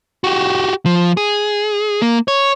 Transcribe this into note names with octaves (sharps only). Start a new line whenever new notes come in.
F#4 G4
F3
G#4
A#3
C#5